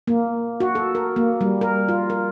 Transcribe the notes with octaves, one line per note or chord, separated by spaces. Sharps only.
A#3
F#4
A4
A#4
A#3
G3
A#4
F4
A#4